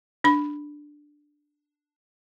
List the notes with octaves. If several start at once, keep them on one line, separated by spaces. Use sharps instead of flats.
D4 B5